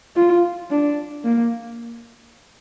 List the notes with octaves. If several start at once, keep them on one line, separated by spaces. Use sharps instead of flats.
F4
D4
A#3